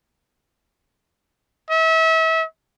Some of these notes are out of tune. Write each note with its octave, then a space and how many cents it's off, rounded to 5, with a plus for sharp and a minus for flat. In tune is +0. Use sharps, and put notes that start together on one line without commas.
E5 -35